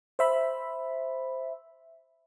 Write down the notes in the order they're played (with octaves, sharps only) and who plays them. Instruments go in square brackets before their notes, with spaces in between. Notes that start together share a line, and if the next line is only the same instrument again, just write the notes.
[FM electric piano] C5 E5 B5